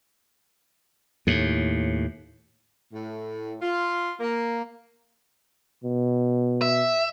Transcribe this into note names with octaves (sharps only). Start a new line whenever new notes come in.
D#2 A2
A2
F4
A#3
B2
E5